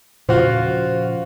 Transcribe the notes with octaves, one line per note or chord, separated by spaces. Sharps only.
A#2 C#3 F3 F4 F#4 C5 F5